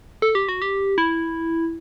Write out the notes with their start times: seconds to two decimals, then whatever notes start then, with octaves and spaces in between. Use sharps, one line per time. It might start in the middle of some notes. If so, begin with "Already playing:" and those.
0.22 A4
0.35 G4
0.49 F#4
0.62 G4
0.98 E4